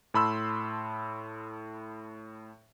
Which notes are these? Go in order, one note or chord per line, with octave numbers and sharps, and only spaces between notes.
A2 A5 B5 C6 E6